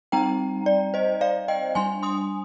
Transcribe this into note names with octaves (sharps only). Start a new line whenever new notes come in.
G3 C4 D#4 G5 A#5
D5
C5 D#5
D5 F5
D#5 G5
G3 D4 G#5 C6
C6 D#6